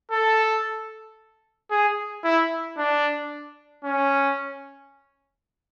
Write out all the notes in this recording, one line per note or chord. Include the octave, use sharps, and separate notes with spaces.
A4
G#4
E4
D4
C#4